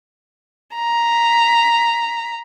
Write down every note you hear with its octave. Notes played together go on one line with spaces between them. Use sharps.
A#5 B6